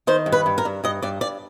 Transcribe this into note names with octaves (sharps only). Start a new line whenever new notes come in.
D#3 C5
G2
B4
G2
A#4
G2
G2 D#5
G2 D5
G2 D5